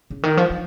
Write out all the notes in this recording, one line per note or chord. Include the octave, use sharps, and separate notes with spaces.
C#3
D#3
F3
F3